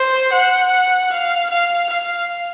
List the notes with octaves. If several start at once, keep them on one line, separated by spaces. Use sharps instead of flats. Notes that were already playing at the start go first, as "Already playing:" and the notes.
Already playing: C5
F#5
F5
F5
F5